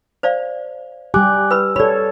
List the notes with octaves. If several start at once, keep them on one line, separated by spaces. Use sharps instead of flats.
C5 D5 F5
G3 G4 G#5 D6 F#6
B4 B5 E6
A4 C#5 D5 B5